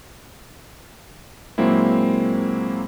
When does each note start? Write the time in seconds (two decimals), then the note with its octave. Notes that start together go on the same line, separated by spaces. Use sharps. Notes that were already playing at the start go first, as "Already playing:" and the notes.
1.58 A#2 F#3 G#3 A#3 C4 E4